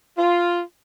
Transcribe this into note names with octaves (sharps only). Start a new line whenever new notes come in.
F4